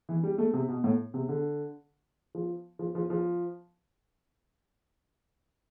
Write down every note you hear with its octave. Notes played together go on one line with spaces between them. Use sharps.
E3
G3
A3
C3
B2
A2
C3
D3
F3
F3
F3
F3